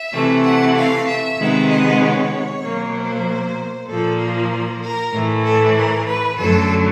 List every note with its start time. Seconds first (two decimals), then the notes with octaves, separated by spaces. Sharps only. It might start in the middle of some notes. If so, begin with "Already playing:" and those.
Already playing: E5
0.13 C3 E3 A3
0.44 F#5
0.75 F5
1.06 E5
1.38 C3 D#3 G#3 B3
1.69 D#5
2.01 C#5
2.62 B2 F#3 A#3
2.93 C5
3.87 A#2 F3 A#3 A4
4.18 A#4
4.81 A#4
5.12 A2 E3 A3
5.43 A4
5.75 A#4
6.05 B4
6.37 F#2 D3 F#3 A3 A4